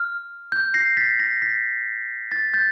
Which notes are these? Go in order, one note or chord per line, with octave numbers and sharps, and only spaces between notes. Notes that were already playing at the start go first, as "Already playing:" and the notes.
Already playing: F6
G6
A#6 C7
A6 B6
A#6 C7
A6 B6
A6 B6
G6 A6